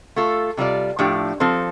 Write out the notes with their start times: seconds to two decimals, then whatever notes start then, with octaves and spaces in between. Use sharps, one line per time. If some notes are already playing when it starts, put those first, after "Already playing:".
0.16 A3 F4 A4
0.57 C3 G3 F4 D5
0.99 A2 F3 A3 D4 G4
1.40 F3 C4 A4